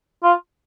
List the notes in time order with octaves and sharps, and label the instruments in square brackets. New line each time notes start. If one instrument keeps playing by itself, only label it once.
[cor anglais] F4